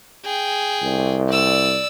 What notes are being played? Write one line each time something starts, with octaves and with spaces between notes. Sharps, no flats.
G#4 G5
C2
D5 E6